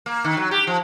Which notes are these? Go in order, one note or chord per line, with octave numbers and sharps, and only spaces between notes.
A#3
D#3
F#3
G4
F3